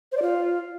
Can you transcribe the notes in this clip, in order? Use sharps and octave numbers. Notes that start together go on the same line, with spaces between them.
C5
D5
F4